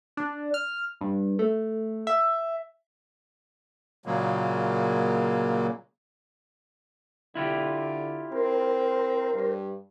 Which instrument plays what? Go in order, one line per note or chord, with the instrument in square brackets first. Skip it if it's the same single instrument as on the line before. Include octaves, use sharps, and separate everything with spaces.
[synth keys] D4
F6
G2
A3
E5
[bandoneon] A#2 C#3 F#3 G#3 A#3
[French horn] D3 [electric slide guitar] E4 F4 G4
[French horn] C4 [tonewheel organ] A#4 C5
[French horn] G2